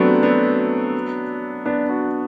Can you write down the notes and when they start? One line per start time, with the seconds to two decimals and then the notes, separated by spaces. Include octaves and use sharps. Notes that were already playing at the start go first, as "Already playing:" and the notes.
Already playing: F#3 A3 B3 C4 D4
0.22 B3 D4
1.66 B3 D4
1.89 D4 F#4